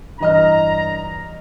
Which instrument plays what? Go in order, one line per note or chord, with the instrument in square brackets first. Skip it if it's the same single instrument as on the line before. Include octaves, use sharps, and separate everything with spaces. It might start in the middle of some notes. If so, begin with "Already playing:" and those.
[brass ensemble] G2 A#5 [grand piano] E3 D#5 F6